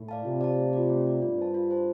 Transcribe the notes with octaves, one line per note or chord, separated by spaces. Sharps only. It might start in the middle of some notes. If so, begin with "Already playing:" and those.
Already playing: A2
D5 F5 A5
C3 F4
D5 F5 A5
A3
F4 D5
A3
F4 D5
G2 F4
C5 A5
F4
C5 A5